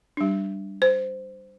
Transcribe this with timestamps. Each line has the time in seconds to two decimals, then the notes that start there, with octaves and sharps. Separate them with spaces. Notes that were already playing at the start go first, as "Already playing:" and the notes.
0.17 G3 D4
0.82 C5